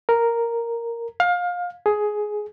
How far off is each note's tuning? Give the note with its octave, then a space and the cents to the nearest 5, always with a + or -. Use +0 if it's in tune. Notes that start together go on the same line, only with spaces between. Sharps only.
A#4 -5
F5 +25
G#4 +10